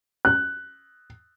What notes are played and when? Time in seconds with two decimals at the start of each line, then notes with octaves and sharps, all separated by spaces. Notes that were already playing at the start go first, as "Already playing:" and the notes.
0.25 F#6